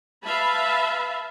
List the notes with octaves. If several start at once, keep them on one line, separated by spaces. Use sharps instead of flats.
B4 E5 F5 A5 B5